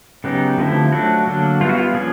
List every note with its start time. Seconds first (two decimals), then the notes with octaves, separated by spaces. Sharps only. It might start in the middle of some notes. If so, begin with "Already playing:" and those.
0.24 C#3 F#3 B3 D#4 G4
0.58 D3 F3 A3 C4 E4
0.92 F#3 A3 D4 F#4
1.27 D3 F#3 A#3 D4
1.61 G3 B3 E4 F4
1.69 F#4
1.77 F4
1.94 F3 A#3 C#4 G#4